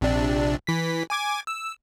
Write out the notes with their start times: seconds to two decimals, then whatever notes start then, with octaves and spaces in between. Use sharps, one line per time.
0.01 A#1 C3 D4
0.67 E3 B6
1.10 G#5 D6 G#6
1.47 E6